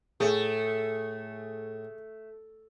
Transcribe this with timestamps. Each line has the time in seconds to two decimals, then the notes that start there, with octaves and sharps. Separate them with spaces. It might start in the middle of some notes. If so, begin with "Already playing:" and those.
0.20 A2 A3 G#4